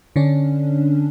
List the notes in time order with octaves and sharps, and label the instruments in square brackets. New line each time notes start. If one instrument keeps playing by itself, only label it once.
[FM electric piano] D3 C#4 D4